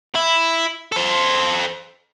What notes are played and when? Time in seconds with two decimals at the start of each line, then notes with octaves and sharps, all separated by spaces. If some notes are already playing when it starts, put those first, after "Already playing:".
0.15 E4
0.92 A4 C5